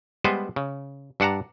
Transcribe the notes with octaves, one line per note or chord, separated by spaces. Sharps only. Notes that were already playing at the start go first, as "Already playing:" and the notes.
G3 G#3 B3 B4 C5
C#3
G2 D4 F#5 A5 A#5